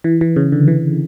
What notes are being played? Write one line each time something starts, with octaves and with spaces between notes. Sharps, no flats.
E3
E3
C#3
D3
E3